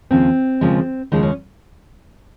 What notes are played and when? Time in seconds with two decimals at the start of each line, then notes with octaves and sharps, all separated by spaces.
0.11 D#2 C#3 F3 G#3 C4
0.61 D#2 C#3 F3 G#3
1.12 D#2 C#3 F3 G#3 D#4
1.23 C#4